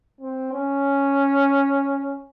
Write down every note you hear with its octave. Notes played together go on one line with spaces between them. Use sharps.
C4
C#4